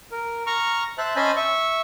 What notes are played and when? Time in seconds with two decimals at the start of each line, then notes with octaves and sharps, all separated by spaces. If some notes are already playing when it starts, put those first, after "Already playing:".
0.11 A#4
0.47 A#5 C#6 F6
0.98 C5 E5 A5 F#6
1.16 C#4 C5 D#5 G#5 A5 B5
1.36 E5 C#6